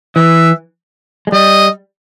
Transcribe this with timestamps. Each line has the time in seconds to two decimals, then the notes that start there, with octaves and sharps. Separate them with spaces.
0.15 E3 E5
1.27 G#3
1.32 G3 D#5